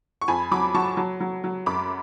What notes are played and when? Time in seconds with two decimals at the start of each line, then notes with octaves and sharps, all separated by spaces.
0.21 C#6
0.28 F2 G#5 B5
0.51 F#3 B5 D6
0.74 F#3 A5 C#6
0.97 F#3
1.20 F#3
1.44 F#3
1.66 F#2 B5 D6